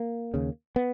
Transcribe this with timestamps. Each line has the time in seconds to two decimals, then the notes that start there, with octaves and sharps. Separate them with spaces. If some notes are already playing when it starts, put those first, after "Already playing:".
Already playing: A#3
0.34 D#2 C#3
0.76 B3